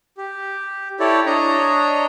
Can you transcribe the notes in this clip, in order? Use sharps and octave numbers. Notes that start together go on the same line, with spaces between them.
G4
E4 G4 A4 C#5 D5
D4 C#5 D#5 A#5